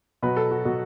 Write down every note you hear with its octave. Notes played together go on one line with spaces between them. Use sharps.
B2 F#3 B4
A4
F#4
B2 F#3 F#4